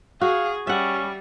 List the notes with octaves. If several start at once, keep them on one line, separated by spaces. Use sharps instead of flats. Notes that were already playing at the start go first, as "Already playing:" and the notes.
F#4 G#4 F5
G3 C#4 E5 F#5